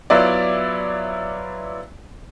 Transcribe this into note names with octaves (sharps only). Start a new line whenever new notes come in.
F#3 B3 E4 F4 D5